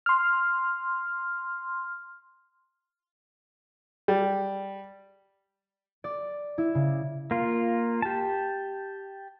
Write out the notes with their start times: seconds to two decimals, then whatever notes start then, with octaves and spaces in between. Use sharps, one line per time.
0.06 C6 F6
4.08 G3
6.04 D5
6.58 E4
6.75 C#3
7.31 A#3 F4
8.02 G4 A5